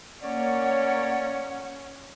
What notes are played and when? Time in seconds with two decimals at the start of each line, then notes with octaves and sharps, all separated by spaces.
0.22 A#3 C#4 C#5 D5 F#5